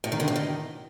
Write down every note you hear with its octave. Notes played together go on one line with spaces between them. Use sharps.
A2
D#3
D3
A2
D#3